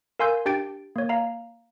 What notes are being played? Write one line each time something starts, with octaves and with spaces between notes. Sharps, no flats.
A#4 F5 G#5 C6 E6 G6
D4 G4 G5 G6 A6 D7
A#3 C#5
F5 A#5